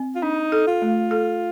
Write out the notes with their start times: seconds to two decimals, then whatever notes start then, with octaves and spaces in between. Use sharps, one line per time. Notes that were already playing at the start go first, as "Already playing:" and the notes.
Already playing: C4
0.15 F4
0.22 D4 D#4
0.52 A4
0.67 F4
0.82 A3
1.11 A4